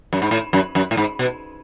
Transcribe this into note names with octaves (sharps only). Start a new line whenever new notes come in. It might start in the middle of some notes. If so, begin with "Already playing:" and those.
F#2
G#2
A2
F#2
F#2
A2
G#2
B2